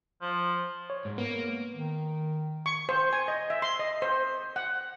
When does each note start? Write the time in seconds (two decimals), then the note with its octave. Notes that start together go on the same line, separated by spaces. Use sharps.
0.22 F3
0.90 C#5
1.05 G#2
1.18 A#3 B3
1.76 D#3
2.66 C#6
2.89 C5
3.13 G#5
3.28 D#5
3.50 E5
3.62 C6
3.80 D#5
4.02 C5
4.56 F#5